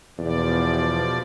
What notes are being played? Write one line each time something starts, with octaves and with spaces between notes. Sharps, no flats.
E2 B2 F3 D5